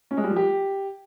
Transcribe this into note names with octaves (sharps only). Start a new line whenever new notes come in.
C#4
G#3
G3
F3
G4